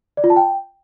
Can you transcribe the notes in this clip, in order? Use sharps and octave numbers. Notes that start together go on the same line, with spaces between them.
D5
F4
A5
G5